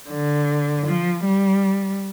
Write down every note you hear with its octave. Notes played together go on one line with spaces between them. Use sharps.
D3
F3
G3